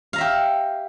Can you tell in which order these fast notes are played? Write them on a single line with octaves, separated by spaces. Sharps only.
F5 A#5 E5 G4